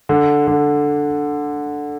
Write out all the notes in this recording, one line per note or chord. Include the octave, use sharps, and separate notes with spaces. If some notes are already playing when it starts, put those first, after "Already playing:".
D3
D3